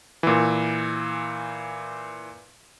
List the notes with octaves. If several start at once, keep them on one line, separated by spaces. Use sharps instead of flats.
A#2 E3